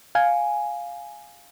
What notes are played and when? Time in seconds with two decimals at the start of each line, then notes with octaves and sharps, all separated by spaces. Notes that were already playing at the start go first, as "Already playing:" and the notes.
0.15 F5 G#5